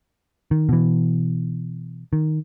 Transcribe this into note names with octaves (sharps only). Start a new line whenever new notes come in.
D#3
B2 E3
D#3